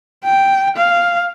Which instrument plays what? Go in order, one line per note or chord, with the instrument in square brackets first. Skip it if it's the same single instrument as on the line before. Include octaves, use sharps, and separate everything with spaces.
[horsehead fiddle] G5
F5